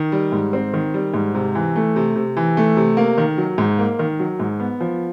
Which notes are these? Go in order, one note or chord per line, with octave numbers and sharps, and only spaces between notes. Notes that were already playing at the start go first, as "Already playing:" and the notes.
Already playing: D#3
G3
G#2
C4
D#3
G3
G#2
C3
E3
A3
C3
C3
E3
A3
C3
A#3
D#3
F#3
G#2
A#3
D#3
F#3
G#2
B3
F3